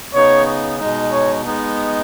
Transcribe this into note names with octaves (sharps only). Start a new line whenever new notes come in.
C#3 B3 D#4 C#5
B2 G#3 D#4
C#5
G#3 B3 D#4